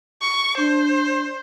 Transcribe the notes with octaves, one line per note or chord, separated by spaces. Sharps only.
C#6
D4 C5